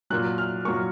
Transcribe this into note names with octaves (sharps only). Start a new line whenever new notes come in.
A#2 F#3 F#6
F6
A#2 F#3 C#6